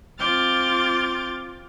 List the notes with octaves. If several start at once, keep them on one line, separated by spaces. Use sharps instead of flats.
C4 F4 D6 F6 G6 A6